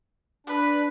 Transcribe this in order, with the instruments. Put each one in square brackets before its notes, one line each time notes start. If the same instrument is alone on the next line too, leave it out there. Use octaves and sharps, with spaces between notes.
[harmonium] D4 [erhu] B4